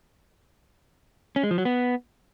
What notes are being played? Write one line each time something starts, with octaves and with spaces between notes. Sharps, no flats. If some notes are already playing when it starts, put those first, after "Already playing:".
C#4
G#3
F3
F#3
B3